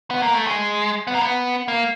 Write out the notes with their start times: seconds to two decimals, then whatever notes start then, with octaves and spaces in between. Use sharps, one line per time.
0.11 B3
0.22 A#3
0.34 A3
0.47 G#3
1.07 B3
1.15 A#3
1.22 B3
1.68 A#3